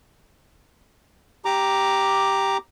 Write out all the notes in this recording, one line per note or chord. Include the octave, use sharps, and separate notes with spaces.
G4 A#5 D6